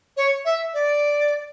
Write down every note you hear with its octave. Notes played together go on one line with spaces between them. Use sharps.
C#5
E5
D5